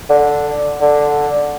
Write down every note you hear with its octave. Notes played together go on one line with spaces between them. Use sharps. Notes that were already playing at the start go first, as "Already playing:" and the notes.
D3
D3